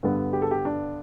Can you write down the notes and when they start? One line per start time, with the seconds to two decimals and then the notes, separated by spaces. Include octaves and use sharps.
0.03 G2 D3 G3 B3
0.33 G4
0.42 A4
0.51 G4
0.65 D4